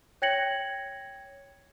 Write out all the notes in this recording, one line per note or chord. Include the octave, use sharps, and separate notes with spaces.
C#5 G5 G#6 A#6 C#7 F#7